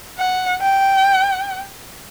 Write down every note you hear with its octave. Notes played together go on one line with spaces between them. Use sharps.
F#5
G5